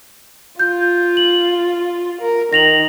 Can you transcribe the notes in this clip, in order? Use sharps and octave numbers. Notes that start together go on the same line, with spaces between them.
F4 G6
F#7
A#4
D#3 A#6 F7 F#7